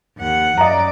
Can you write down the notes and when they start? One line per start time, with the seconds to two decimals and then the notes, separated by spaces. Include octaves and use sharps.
0.17 D#2 F#5
0.58 F#2 D5 D#5 A#5